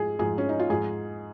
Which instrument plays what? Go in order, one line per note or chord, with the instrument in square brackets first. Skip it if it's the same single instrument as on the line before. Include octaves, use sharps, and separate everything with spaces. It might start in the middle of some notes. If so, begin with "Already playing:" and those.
Already playing: [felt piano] G#2 F3 G#4
G#2 F3 G#4
C#4
D#4
F4
G#2 F3 G#4